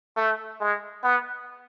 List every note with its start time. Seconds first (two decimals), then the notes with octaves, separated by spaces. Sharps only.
0.17 A3
0.60 G#3
1.03 B3